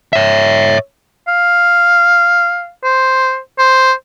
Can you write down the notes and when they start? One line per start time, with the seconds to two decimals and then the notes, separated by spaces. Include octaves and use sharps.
0.13 C#5 E5
1.28 F5
2.84 C5
3.59 C5